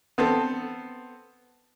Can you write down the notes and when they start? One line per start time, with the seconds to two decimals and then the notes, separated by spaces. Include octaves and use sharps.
0.18 B3 C4 A4